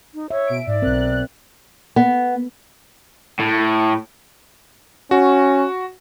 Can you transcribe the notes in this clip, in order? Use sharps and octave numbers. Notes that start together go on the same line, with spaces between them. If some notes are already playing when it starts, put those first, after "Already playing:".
D#4
C#5 E5
B2 D7
G#2 D5
B1 C4 A#4 F#6
B3
A2
C#4 F#4